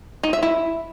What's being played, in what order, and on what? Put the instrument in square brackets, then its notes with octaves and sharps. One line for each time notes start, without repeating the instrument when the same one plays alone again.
[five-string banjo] D#4
E5
E4